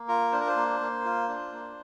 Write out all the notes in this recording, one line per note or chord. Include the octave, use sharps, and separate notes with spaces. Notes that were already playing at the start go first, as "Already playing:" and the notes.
Already playing: A#3
F4 A#4
D4 C5
A#4
C5
A#3
A#3
F4
D4
A#3